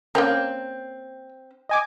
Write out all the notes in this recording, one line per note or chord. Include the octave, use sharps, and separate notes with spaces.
A#3 C4 C#4 A#4
D#5 G#5 D6